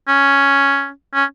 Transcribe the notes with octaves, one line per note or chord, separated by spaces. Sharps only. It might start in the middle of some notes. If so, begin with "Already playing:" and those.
C#4
C#4